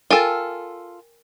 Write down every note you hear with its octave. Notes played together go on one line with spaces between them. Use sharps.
F4 A4 A#4 G5 G#5